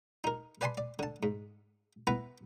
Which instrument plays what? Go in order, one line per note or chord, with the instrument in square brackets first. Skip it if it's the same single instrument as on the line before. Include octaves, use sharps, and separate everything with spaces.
[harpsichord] D#4 A#4
B4 D5 G#5 A5 B5 C6
D5
D3 A5
G#2
B3 E4 B4 A#5 B5